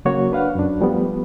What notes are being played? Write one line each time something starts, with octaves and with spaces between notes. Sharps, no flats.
C#3 F#3 A#3 F#4 C#5
D4 B4 F5 F#5
F#2 D4
F3 G3 A3 B3